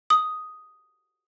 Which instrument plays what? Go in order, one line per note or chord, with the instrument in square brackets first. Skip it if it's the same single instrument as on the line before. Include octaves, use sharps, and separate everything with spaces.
[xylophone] D#6